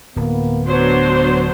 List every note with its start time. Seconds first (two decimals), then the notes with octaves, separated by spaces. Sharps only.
0.16 D1 A#3 B3
0.68 F#3 B3 D4 C5